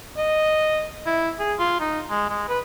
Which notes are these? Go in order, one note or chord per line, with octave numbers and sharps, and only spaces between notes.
D#5
E4
G#4
F4
D#4
G#3
G#3
B4